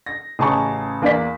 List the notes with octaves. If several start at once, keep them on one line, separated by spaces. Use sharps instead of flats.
A#6
A1 C#3 G#4 A5 A#5 C#6
E2 A#3 A#4 D5 B6